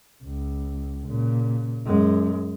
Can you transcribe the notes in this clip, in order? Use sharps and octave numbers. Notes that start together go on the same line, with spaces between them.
C#2
A#2 C#3
F#2 G#3